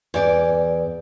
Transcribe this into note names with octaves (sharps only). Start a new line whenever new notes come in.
E2 D5